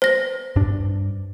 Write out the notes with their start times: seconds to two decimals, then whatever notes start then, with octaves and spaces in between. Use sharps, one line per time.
0.02 C5 A#6
0.55 G2 D4